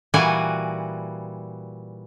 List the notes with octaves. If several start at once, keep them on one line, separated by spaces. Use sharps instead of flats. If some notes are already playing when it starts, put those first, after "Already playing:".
A#2 E3 G3 F#4 F#5 G#5